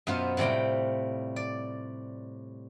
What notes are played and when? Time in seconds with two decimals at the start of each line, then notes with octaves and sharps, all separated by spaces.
0.07 F#2 B2 B3 F4 C5
0.37 A2 C3 G3 G5
1.36 D5